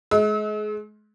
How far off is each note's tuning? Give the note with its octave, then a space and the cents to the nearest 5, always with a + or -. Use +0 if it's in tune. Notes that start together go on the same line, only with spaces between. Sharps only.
G#3 +35 E6 -40